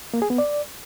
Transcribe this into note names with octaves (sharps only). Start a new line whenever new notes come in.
A#3
G#4
B3
D5